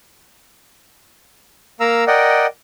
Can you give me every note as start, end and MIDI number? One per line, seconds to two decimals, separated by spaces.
1.80 2.04 58
1.80 2.04 70
1.80 2.04 77
1.80 2.04 82
1.80 2.04 88
2.07 2.46 70
2.07 2.46 74
2.07 2.46 75
2.07 2.46 78
2.07 2.46 79